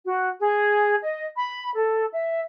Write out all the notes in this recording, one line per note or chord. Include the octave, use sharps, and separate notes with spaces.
F#4
G#4
D#5
B5
A4
E5